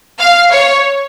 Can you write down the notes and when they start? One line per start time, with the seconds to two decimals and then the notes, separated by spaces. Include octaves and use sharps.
0.20 F5
0.52 C#5